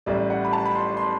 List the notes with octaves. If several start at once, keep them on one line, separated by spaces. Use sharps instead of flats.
A1 A2 G3 D5
F#5
B5
A5
B5
C6
C6